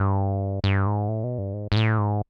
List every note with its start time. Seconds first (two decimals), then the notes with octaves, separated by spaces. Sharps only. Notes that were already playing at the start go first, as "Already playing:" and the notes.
Already playing: G2
0.64 G2
0.87 G#2
1.09 A2
1.24 B2
1.38 G2
1.53 G#2
1.72 G#2
1.77 A2
1.98 G#2